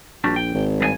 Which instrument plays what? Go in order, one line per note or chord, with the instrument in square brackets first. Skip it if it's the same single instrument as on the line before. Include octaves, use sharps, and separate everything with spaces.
[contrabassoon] A#1 [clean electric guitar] G3 D4 F#4
[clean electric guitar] G5
[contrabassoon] G#1
[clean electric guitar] G2 G#4 G#5